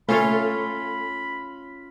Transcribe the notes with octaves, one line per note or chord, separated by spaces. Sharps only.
A3 C#4 F4 A4 C#5 B5